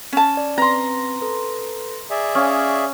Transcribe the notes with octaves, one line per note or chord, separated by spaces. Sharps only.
C#4 A5
D5
C4 B4 A#5 C6
A4 B4
G#4 D5 E5
C#4 F5 C#6 D#6